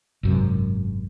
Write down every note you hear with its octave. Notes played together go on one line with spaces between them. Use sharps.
G#1 F#2 C3